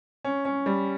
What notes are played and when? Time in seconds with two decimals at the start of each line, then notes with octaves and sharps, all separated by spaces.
0.25 C#4
0.45 C#4
0.66 G3